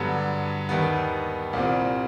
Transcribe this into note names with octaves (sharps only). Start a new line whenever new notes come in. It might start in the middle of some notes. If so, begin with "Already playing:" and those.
Already playing: G2 D3 F#3 B3
D#2 D#3 G3 B3
C2 A#2 G3 C4